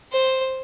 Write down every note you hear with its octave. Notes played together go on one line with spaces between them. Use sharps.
C5